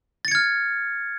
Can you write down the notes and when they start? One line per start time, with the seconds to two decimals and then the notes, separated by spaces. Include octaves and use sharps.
0.25 A6
0.28 C#7
0.31 G#6
0.35 F6